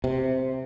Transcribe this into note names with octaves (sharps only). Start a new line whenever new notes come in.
C3